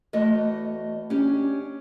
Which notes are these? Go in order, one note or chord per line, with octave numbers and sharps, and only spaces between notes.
E2 A3 F#4 D#5
C#4 D4 G4